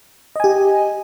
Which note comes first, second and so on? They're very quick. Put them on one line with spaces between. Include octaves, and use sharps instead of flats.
D#5 G#5 G4